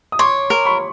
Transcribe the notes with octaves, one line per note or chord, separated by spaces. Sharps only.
D#6
C#5 C6 D6
A#4
B5 C#6